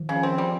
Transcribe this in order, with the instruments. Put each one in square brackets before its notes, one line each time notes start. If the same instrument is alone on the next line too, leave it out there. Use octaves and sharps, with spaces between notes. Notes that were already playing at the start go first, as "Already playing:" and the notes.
Already playing: [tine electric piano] D#3 F3
[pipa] C#3
[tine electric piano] F3
[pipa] C4
[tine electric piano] F3 [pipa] G3